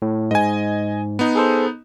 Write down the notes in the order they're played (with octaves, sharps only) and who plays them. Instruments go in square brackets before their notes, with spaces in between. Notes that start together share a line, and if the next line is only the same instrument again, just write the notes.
[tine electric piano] A2
[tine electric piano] G#2 [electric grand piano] D#5 G#5
[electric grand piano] B3 D#4
[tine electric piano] G#4 A4 C5